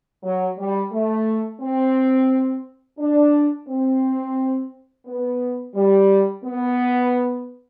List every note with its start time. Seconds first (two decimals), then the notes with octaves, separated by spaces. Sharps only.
0.23 F#3
0.57 G3
0.92 A3
1.61 C4
2.99 D4
3.68 C4
5.06 B3
5.75 G3
6.44 B3